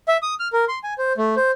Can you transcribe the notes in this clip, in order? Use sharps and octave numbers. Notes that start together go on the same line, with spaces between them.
E5
D#6
F6
A#4
C6
G#5
C5
A3
C5